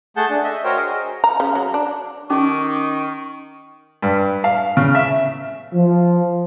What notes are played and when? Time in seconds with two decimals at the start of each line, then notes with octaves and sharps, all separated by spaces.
0.17 A3 G#4 F#5 A5 G6
0.30 D4
0.44 D#5 E5
0.64 F#4 A#4 C5 C#5 G5
0.77 G#4 A#4 D#5
1.24 A#5
1.40 C#3
1.55 F#3
1.74 D4
2.30 D#3 C#4 D#4 C#6 D6
4.02 G2
4.44 F5
4.77 C#3
4.95 E5
5.74 F3